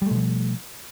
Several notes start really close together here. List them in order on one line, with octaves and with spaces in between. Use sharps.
G3 A3 B2 F3